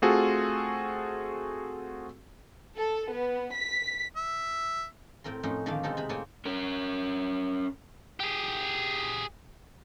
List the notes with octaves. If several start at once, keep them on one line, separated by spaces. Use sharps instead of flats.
A3 C4 F4 F#4 G#4 A4
A4
B3
B6
E5
A2 C4 A#4 C6
F2 A2 C#4 D#4 C6
D3 D#3 F3 A3 A#3 F5
B2 G#3 C4 D#4 A4
C3 G#4 B5
A2 A#3 C4 C#5 G#5 A5
C#4 A#4
G4 G#4